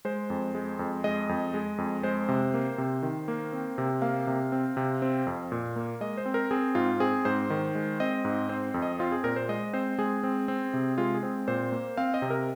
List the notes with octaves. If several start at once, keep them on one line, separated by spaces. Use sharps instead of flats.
G#3 C5
F2
G#3
F2
G#3 D#5
F2
G#3
F2
G#3 C5
C3
A#3
C3
D#3
A#3
C4
C3
A#3 F5
C3
C4
C3
C4
F2
A#2
A#3
G#3 D#5
C5
C4
A#4
C4 G#4
G#2 F4
C4 G#4
G#2 C5
D#3
G#3
C4 D#5
G#2
C4 C5
F2
D#5
C4 F4
G#4
A#2 A#4
C5
G#3 D#5
C4 C5
G#3 G#4
C4
C4
C3
G#3 F4
G#4
C4
A#2 C5
A#3
C4 F5
D#5
C3
A#4